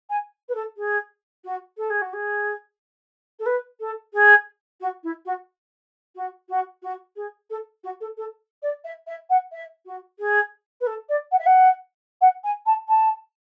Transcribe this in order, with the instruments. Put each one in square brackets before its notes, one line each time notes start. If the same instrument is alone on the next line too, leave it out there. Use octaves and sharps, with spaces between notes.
[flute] G#5
B4
A4
G#4
F#4
A4
G#4
F#4
G#4
A4
B4
A4
G#4
F#4
E4
F#4
F#4
F#4
F#4
G#4
A4
F#4
A4
A4
D5
E5
E5
F#5
E5
F#4
G#4
B4
A4
D5
F#5
E5
F#5
F#5
G#5
A5
A5